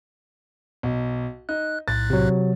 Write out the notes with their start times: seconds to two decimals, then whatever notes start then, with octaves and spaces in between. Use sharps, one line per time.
0.83 B1
1.49 D#4 F#6
1.88 B1 A2 F#6 A6
2.10 C3 F#3